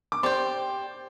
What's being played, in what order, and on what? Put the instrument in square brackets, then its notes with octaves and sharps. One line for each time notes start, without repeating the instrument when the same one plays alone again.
[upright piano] D6
[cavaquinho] G4 D5 G5 [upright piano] C5 C6